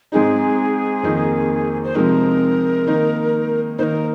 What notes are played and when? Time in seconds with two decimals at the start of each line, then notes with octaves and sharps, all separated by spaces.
0.12 G#2 G#3 C4 D#4 G#4
1.03 F2 D#3 A#3 D#4
1.84 C5
1.94 C3 F3 G#3 C4 D#4 A#4
2.86 D#3 A#3 D#4
3.78 D#3 A#3 D#4 A#4 C5